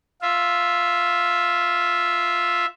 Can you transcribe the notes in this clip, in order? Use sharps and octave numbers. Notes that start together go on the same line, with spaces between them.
F4 E5